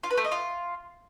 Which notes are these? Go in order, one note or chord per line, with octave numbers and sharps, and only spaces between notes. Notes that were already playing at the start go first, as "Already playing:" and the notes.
F4
B4
A3
D#5
F4